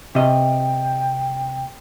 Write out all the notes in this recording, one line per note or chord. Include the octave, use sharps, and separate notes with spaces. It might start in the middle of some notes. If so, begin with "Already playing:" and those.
C3 D#5 G5